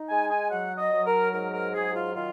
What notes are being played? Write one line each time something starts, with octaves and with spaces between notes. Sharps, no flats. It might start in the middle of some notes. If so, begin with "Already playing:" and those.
Already playing: D#4
G#3 G#5
G#5
F#3 F#5
D#5
F#3
A#4
G#2 A#4
A#4
F#3 G#4
F4
D#3 F4